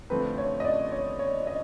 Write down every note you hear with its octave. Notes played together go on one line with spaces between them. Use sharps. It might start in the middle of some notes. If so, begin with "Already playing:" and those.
D3 F3 A3 C4 B4
C#5
D#5
D5
C#5
C#5
D#5